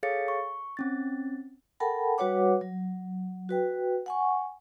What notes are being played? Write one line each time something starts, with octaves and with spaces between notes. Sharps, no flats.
G#4 A4 C#5 F5 A6 C#7
C#6
C4 C#4 A6
A4 A#4 F#5 G5 A5 B5
G3 F#4 B4 C#5 F#5 D6
F#3
F#4 B4 G5
F#5 G#5 C#6